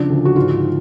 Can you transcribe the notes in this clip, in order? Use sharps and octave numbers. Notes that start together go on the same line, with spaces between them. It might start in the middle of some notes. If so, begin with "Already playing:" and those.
Already playing: C#2 F3 D4
D2
F#4
G#2 F4